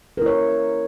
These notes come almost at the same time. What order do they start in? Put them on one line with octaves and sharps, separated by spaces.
A#4 E4 C#5